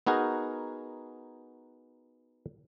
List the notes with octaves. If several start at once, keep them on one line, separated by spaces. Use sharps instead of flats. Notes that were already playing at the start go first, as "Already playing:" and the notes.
B3 D#4 F#4 G#4 A#4